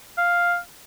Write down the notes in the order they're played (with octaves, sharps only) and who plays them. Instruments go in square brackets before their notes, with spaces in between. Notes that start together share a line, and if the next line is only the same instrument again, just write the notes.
[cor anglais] F5